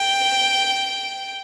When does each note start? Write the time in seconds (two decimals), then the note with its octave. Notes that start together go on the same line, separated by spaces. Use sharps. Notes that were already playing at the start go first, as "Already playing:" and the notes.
Already playing: G5